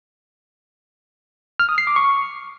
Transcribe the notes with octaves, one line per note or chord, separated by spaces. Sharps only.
F6
D#6
C7
D6
C#6